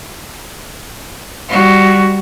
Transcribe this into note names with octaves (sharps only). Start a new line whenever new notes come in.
G3 F#4